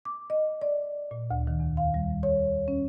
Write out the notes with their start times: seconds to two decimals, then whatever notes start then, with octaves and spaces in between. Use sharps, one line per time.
0.05 D6
0.30 D#5
0.62 D5
1.11 A#2
1.31 D2
1.47 D#3
1.60 E2
1.77 F5
1.94 G3
2.23 C#5
2.68 C#4